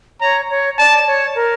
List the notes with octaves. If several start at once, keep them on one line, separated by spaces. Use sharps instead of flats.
C#5 A#5
C#5
D5 A5
C#5
A#4